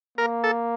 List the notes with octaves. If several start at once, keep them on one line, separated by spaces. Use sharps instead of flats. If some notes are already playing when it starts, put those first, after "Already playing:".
A#3 A#4
A4